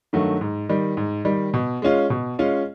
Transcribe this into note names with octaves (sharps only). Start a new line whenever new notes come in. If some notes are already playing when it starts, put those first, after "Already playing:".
G2 D#3 F#3 A3
G#2
D#3 G3
G#2
D#3 G3
B2
G#3 C#4 F4
B2
G#3 C#4 F4